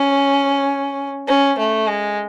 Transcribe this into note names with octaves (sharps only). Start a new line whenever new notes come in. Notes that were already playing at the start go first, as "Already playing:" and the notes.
Already playing: C#4
C#4
A3
G#3